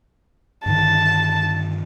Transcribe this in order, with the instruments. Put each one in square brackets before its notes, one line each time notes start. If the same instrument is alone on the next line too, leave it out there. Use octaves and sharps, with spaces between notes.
[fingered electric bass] G2 D3 D#3 [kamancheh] A5